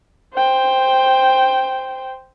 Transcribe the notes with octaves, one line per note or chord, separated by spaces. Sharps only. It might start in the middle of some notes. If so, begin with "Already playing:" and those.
C5 G5